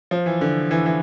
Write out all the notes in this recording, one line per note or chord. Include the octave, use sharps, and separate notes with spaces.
F3
E3
D3
E3
E3